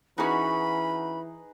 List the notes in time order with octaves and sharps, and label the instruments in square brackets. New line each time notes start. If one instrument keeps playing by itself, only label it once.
[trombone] E3 [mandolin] C#4 F#4 [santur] D#4 G#4 B4 [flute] B5